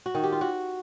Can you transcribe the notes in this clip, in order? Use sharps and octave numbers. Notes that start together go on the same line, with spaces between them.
F#4
D#3
G4
F4
F#4